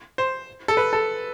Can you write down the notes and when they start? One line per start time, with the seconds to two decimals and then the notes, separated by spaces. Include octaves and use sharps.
0.18 C5
0.68 A4
0.77 B4
0.93 A4